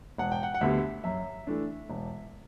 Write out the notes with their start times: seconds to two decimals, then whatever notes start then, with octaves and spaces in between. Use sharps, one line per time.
0.18 E1 F#5
0.32 G5
0.43 F#5
0.54 F#5
0.61 D2 D3 G3 B3 E5
1.04 F#2 E5
1.47 E3 A3 D4
1.90 E1